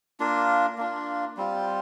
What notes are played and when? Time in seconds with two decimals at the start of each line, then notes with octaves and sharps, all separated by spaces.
0.20 A#3 D4 F4
0.78 A#3 D4 F4
1.37 G3 C4 F4